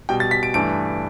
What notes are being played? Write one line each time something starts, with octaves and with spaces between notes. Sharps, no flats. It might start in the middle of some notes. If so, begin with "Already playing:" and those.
B2 G3 G5
A6
B6
D7
G2 E3 A3 D7